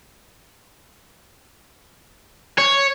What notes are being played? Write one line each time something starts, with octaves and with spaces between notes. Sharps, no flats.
C#5